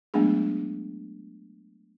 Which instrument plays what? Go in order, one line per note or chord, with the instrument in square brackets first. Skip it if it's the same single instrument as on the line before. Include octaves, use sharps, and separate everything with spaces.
[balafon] F#3 G#3 A3 B3 D4 G#4